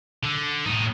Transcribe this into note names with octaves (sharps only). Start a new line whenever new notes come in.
D3
A2 D#4